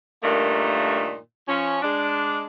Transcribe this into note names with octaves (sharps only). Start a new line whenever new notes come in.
G2 A#2 D#3 A3 A#3
F3 C#4
G#3 D4